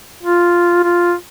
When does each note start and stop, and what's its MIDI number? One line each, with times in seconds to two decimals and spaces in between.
0.23 0.83 65
0.84 1.15 65